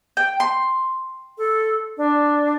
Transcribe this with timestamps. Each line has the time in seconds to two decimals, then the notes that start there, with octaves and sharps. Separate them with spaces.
0.17 G5
0.40 C6
1.38 A4
1.97 D4